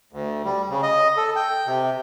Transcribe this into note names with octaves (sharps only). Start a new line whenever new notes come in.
D2
G3
C#3
D#5
A4
G5
C3